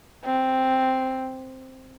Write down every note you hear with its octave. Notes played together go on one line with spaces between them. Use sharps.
C4